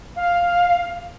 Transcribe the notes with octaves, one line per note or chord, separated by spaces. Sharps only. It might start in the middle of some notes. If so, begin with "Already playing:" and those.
F5